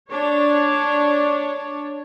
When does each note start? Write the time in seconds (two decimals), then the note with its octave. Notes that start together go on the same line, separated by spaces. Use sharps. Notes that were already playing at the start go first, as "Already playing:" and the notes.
0.11 D4 C#5